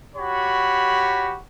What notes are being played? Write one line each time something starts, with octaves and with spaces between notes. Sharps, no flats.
F#4 G4 C#5 B5